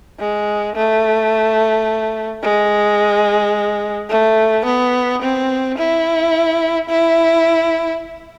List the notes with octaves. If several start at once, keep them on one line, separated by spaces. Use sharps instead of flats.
G#3
A3
G#3
A3
B3
C4
E4
E4